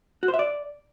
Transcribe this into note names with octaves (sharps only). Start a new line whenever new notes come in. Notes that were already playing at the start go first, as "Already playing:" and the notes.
F#4
C5
E5
D5